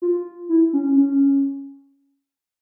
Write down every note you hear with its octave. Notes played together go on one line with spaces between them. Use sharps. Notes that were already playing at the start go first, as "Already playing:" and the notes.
F4
E4
C#4
C#4